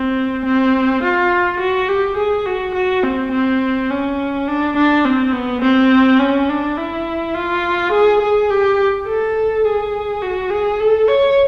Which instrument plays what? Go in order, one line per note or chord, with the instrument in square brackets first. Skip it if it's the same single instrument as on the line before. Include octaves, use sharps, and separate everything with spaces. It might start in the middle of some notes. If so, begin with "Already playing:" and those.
Already playing: [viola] C4
C4
F4
F#4
G4
G#4
F#4
F#4
C4
C4
C#4
D4
D4
C4
B3
C4
C#4
D4
E4
F4
G#4
G#4
G4
A4
G#4
F#4
G#4
A4
C#5